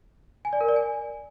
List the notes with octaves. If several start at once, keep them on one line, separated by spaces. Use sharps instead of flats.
G#5
D5
A#4
D5
G#5